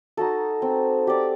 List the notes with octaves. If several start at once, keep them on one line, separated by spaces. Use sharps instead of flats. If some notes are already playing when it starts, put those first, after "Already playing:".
D#4 F#4 A4
C4
G4 D5